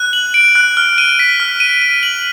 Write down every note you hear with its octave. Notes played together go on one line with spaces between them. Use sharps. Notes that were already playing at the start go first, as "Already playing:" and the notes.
Already playing: F#6
F#7
D7
F#6
F6
D#7
B6
F6
D#7
D#7
F#7